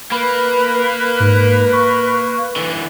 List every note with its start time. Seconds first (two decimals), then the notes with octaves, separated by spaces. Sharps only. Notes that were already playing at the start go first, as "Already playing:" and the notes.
0.12 A#3 B4 B5
1.20 G#2
1.73 C#6
2.56 D3 E3